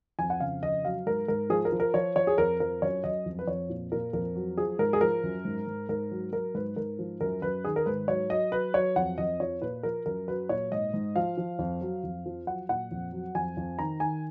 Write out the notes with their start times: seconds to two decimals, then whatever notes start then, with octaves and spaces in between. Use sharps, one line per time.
0.19 F2 G#5
0.30 F#5
0.40 C#3 F5
0.63 F2 D#5
0.84 F#3 F5
1.06 G#2 A#4
1.28 G#2 A#4
1.50 F3 G#4
1.65 A#4
1.72 F3
1.80 A#4
1.94 F3 C#5
2.15 F3 C#5
2.27 G#4
2.38 F2 A#4
2.60 F3 A#4
2.82 F#2 C#5
3.04 F#2 D#5
3.26 F2
3.39 B4
3.47 F2 C#5
3.70 A#2
3.92 A#2 A#4
4.13 F2 A#4
4.35 F#3
4.57 F3 G#4
4.79 G#2 A#4
4.93 G#4
5.01 F3 A#4
5.23 F#2
5.45 G#2
5.67 G#2
5.89 G#2 A#4
6.11 F#3
6.33 F#3 A#4
6.54 G#2 B4
6.76 G#2 A#4
6.99 F3
7.21 F#2 A#4
7.42 F#2 B4
7.64 D#3 G#4
7.76 A#4
7.86 G#2 B4
8.08 F#3 C#5
8.30 F#3 D#5
8.52 F#3 B4
8.74 F#3 C#5
8.96 F2 F#5
9.18 F2 D#5
9.40 F3 C#5
9.62 A#2 B4
9.83 F3 A#4
10.06 F#2 A#4
10.28 F#3 B4
10.49 A#2 C#5
10.72 G#2 D#5
10.93 G#2
11.16 F3 F5
11.38 F3
11.59 F2
11.81 F#3
12.03 F2
12.26 F3
12.47 F#3 F#5
12.69 A#2 F#5
12.91 F2
13.12 F#3
13.35 F2 G#5
13.57 F2
13.79 D#3 A#5
14.00 D#3 G#5